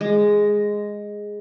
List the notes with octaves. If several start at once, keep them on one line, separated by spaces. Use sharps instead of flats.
G#3